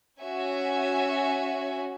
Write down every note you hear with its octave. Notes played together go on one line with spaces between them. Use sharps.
C#4 F#4 E5 G#5